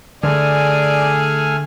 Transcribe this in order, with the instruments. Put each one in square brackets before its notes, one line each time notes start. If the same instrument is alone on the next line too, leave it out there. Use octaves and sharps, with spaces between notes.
[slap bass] D3 [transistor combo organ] A3 G#5 F6 [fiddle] G#4 [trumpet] D5